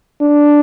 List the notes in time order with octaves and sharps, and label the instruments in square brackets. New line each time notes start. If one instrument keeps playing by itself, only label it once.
[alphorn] D4